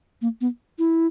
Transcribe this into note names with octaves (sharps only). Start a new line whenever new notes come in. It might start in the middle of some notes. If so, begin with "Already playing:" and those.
A#3
B3
E4